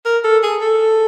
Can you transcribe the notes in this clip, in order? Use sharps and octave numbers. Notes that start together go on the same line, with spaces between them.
A#4
A4
G#4
A4